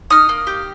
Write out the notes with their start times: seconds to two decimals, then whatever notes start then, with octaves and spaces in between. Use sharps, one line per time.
0.10 D#4 D#6 F6
0.29 A#3
0.47 G4